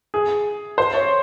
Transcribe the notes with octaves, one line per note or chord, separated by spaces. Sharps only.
G#4
C5
C#5